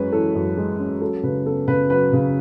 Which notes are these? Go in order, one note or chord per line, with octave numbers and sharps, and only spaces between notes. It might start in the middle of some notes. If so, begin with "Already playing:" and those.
Already playing: F#2 G#3 C#4 B4 C#5
E3 A4
F#2
G#3
C#4
F#3 A4
C#3 B4
B3 A4
C#3 B4
F#3 B4
C#3